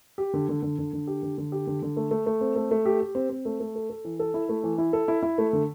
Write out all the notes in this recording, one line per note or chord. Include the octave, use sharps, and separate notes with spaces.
G4
D3
D3
D3
D3
D3
G4
D3
D3
G4
D3
D3
A3
A3
A3
C4
A3
A3
G4
G4
C4
C4
A3
A3
A4
A4
E3
A4
E4
A3
E3
E4
A4
E4
E4
A3
D3